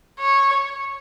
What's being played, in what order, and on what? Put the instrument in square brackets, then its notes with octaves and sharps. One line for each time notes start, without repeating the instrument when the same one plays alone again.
[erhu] C#5